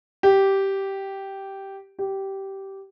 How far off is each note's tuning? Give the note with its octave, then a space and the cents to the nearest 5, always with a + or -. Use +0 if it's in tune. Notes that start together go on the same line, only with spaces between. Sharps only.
G4 -10
G4 -15